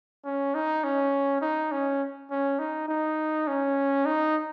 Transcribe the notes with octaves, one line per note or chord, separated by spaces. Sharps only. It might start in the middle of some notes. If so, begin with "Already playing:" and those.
C#4
D#4
C#4
D#4
C#4
C#4
D#4
D#4
C#4
D#4